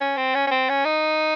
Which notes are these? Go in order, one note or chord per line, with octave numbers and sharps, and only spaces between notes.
C#4
C4
C#4
C#4
C4
C#4
D#4